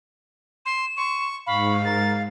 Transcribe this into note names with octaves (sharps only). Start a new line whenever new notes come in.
C6 E7
C6 C#6
G#2 F5 B5 C#6
A#4 A6